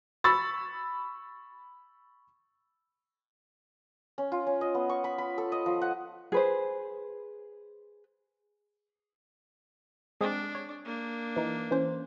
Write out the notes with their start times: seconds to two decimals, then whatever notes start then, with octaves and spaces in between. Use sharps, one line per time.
0.24 B5 C#6 E6 A6
4.18 C#4
4.32 F4
4.47 C#4
4.61 D#5
4.74 B3
4.89 C#6
5.04 B5
5.18 B5
5.38 A4
5.52 D#5
5.66 F3
5.81 F#5
6.32 G#4 B4 C5
10.21 G#3 C4 D4 G#4
10.55 C#5
10.85 A#3 D4
11.36 E3 D#4
11.71 E3 C#4 C5